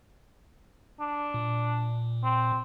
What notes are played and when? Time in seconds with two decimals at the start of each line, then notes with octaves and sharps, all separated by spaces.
1.00 D4
1.34 A#2
2.23 C4